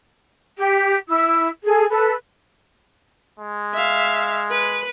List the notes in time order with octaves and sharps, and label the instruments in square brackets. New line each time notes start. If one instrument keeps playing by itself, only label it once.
[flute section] G4
E4 E6
G#4 A4 G#5
A4 B4
[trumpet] G#3
[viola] E5 F5
B4